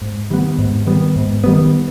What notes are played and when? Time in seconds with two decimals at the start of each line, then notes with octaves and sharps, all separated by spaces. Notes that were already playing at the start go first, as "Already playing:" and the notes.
0.01 G#2
0.30 D#3 G3 B3
0.59 G#2
0.86 D#3 G3 B3
1.16 G#2
1.44 D#3 G3 B3